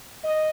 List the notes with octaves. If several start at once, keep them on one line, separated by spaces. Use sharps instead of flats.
D#5